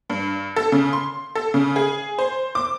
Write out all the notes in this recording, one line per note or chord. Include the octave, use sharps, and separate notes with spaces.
G2
A4
C#3
C6
A4
C#3
G#4
C5
D6